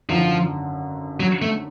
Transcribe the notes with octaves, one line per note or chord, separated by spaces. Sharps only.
G#1 F#2 D3 F3
F#3
A3